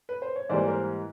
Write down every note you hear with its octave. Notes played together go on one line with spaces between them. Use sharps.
B4
C5
C#5
G#2 E3 G3 A#3 C5 D5
A#4 C5